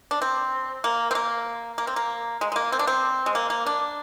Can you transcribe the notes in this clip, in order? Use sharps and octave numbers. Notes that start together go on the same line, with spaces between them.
D4
C4
A#3
C4
A#3
A#3
C4
A#3
G#3
G#3
A#3
C4
D4
C4
G#3
A#3
A#3
D4